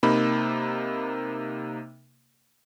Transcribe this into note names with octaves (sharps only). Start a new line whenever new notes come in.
C3 A#3 D#4 B5